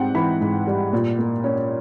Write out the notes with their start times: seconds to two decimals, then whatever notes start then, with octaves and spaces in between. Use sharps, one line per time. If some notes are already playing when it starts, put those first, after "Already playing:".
Already playing: G#2 G3 C4 F#5 G5
0.15 E3 B5
0.41 G#2
0.67 G3
0.93 A#2
1.19 A#3
1.44 C#4